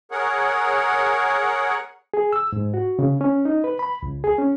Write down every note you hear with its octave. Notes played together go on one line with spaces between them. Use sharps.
G#4 A#4 C#5 F#5
G#4
E6
G#2
F#4
C#3
C#4
D#4
B4
B5
C#2
G#4
C#4